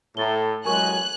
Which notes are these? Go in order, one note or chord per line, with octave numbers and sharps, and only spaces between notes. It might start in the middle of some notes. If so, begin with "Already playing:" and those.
A2 A4 A#5 A6 G7
A1 F#3 G#3 A#4 G#5 C#6 F#6